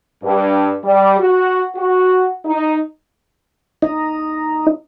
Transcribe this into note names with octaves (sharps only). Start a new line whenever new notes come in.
G2
G3
F#4
F#4
D#4
D#4